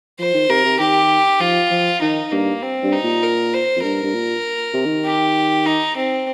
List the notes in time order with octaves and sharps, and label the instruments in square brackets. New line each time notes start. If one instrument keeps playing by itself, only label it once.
[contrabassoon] F3 [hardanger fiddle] C5
[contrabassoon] D#3
[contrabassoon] C3 [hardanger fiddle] A#4
[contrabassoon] C3
[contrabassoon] D#3 [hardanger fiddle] G4
[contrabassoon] F3 [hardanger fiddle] F4
[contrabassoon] F3
[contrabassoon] D#3 [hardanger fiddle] D#4
[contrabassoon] G2 [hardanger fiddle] A#3
[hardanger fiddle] C4
[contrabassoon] G2
[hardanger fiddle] D#4
[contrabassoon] A#2
[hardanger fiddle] A#4
C5
[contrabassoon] F2
[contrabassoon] G2 [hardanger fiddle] A#4
[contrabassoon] G2
A#2
C3
D#3
[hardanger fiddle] G4
D#4
C4